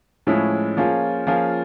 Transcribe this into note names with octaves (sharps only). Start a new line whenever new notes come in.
A2 F3 G#3 C#4 E4
F3 A#3 C#4 F4 G#4
F3 A#3 C#4 F4 G#4